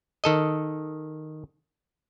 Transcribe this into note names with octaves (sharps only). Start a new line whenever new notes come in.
D#3 A4 D#5